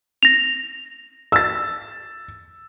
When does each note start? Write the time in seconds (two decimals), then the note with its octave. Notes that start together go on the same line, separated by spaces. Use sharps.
0.23 A#6 F7
1.32 E6 A6